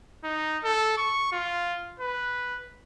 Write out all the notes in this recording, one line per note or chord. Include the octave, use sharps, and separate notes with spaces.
D#4
A4
C#6
F4
B4